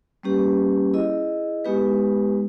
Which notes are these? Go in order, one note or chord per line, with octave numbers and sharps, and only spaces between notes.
G3 A#3 C#4 G4 B4
E4 G#4 D#5
G#3 B3 D#4 G4 B4